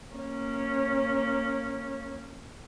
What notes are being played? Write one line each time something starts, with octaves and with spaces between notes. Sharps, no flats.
A#3 C#4